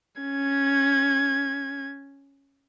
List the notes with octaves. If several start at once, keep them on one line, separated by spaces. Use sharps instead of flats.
C#4 G#6